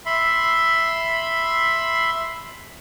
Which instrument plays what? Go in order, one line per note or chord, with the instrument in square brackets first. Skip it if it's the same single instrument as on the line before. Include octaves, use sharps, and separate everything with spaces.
[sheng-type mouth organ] E5 B5 C6